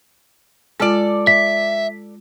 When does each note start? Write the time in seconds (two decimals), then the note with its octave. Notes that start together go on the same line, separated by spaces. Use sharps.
0.80 G#3 F4 A4 D5
1.27 E5 B6